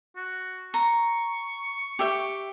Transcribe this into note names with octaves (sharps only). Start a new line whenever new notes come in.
F#4
A#5 C#6
G4 E5 G5